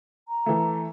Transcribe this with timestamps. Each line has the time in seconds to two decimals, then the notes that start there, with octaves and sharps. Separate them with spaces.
0.28 A#5
0.46 E3 A3